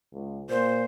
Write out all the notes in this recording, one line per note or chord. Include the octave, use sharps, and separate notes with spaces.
C#2
A#2 C5